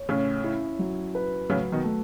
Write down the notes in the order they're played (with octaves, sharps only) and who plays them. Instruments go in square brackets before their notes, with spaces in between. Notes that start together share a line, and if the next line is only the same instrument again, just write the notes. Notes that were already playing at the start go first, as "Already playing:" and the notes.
Already playing: [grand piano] C#5
[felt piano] A2 C#3 [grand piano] C#4
[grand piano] E4
F#3
B4
[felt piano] A2 C#3 [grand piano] F#3
[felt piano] B2 D#3
[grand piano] A3